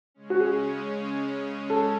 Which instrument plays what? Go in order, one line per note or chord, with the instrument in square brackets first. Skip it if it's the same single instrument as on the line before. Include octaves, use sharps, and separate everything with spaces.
[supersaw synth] C#3 G#3 C#4
[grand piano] F#4
G#4
A4